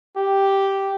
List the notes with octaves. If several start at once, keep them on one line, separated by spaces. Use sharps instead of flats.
G4